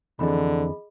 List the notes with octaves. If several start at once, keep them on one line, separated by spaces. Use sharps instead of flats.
F2 D3 E3 C4 G#4 D#5 B5